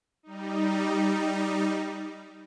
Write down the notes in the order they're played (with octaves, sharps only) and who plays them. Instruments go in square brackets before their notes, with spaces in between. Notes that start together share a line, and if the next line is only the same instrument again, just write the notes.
[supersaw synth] G3 D#4